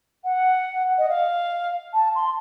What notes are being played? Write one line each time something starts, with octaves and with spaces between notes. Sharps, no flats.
F#5
D#5
F5
A5
C6